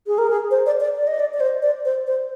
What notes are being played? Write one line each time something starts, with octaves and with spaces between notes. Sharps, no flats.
G#4
A#4
G#4
C5
D5
D5
D5
D#5
D5
D5
C5
D5
C5
C5